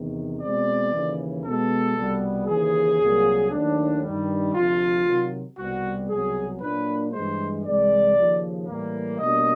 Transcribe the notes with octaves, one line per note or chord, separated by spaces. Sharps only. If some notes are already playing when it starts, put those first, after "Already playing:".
Already playing: E2 C3 D#3
B2 G#3 C4 D5
D#2 C#3 E3
B2 G#3 B3 A4
C2 B2 G3 B3
D#2 C#3 E3 G#4
C2 A#2 F#3 A#3
D#2 D#3 F#3 A3 D4
G2 D#3 G3
D2 C3 F3 F4
C3 D#3 F#3
C2 B2 G3 C4 F#4
C2 B2 F#3 G#4
A#2 F#3 A#3 D4 B4
G2 E3 G#3 C5
C2 C3 E3 G#3 D5
D#2 C#3 F3
A2 E3 G3 A#3
B2 G3 A#3 D4 D#5